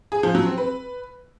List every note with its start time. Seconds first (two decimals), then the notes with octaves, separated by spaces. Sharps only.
0.12 G#4
0.23 F3
0.35 F#3
0.46 C4
0.58 B4